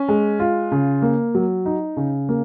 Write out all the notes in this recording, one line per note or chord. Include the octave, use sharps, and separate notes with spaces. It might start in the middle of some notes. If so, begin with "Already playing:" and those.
Already playing: C#4
G#3
F4
C#3
A#3
F#3
D#4
C#3
A#3